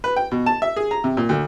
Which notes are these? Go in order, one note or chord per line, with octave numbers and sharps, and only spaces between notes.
B4
G5
B2
A5
E5
G#4
A#5
C3
A#2
D2